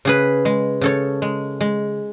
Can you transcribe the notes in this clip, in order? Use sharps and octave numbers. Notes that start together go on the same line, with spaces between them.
C#3 G#4 B4
G#3
C#3 A4 C#5
G#3
G#3